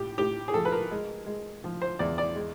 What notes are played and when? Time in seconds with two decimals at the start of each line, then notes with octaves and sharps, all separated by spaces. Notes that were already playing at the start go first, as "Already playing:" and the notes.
Already playing: A2 G4
0.18 A2 G4
0.48 G#4
0.54 F3 A4
0.65 B4
0.72 A#4
0.91 G#3
1.26 G#3
1.64 F3
1.82 C5
1.99 E2 D5
2.18 D5
2.36 G#3